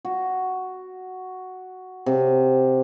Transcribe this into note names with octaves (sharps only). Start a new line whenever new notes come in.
F#4
C3